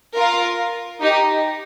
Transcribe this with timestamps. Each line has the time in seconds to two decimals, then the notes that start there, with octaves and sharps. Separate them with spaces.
0.17 F4 A#4
1.01 D#4 G4